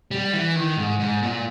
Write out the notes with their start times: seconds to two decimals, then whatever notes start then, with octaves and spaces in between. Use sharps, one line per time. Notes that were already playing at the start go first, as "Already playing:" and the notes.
0.11 G3
0.33 E3
0.56 D#3
0.77 G#2
0.99 G#2
1.22 A#2